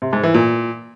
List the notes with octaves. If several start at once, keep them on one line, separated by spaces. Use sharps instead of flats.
C3
G#2
E3
A#2